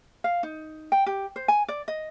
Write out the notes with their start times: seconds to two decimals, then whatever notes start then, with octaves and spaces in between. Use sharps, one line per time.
0.24 F5
0.43 D#4
0.92 G5
1.06 G4
1.36 C5
1.48 G#5
1.68 D5
1.88 D#5